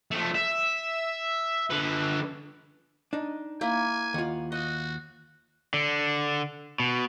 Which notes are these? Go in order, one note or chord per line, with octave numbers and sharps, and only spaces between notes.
F3 A3
E5
D3 B4
D4 D#4
A#3 E4 G#5
D#2 F4 F#5
F#4 D#5
D3
B2